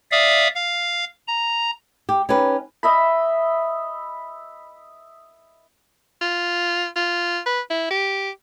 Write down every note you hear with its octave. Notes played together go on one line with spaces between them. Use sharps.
D5 E5 F5 D#6
F5
A#5
G4
C#4 D#4 G4 B4
D#5 E5 B5
F4
F4
B4
E4
G4